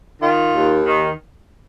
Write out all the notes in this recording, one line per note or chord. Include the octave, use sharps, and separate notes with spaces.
D#3 F4
D#2
D#3